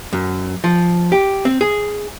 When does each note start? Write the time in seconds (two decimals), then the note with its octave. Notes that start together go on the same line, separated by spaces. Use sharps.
0.13 F#2
0.64 F3
1.12 G4
1.45 C4
1.61 G#4